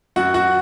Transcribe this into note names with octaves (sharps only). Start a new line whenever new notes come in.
F#2 F#4 F#5
F#4 F#5